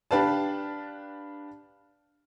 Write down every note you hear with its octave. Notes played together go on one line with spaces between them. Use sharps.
D4 G4 B4 F5 A5